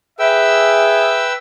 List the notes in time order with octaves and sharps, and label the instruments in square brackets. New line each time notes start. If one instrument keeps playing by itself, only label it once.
[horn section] G#4 E5 [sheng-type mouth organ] B4 G5 E6